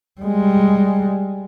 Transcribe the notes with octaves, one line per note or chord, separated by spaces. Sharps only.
G3 G#3